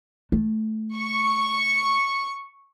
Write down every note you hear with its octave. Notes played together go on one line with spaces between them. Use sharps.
A3
C#6